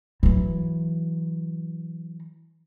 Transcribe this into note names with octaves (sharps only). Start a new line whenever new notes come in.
E3 F#3